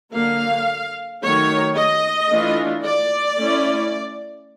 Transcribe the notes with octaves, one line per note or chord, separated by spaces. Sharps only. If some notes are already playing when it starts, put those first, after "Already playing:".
D3 F#3 A#3 F5
D#3 F#3 A3 C#5
D#5
E3 A3 D4 F4
D5
A3 C#4 E4